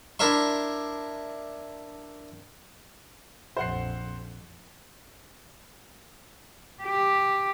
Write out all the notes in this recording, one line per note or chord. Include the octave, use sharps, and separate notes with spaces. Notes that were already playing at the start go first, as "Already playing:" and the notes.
D4 E4 A#4 E5 C6
A#1 F2 C5 F#5 C7
G4